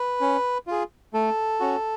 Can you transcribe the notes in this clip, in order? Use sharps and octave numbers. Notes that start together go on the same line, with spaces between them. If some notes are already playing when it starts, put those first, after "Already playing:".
Already playing: B4
C#4
F4 G#4
A3 A4
C#4 F#4